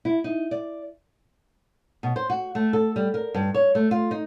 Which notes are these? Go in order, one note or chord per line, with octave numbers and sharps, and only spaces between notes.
E4
D#4
D5
B2
C5
F#4
A3
A4
G3
A#4
G2
C#5
A3
F4
D#4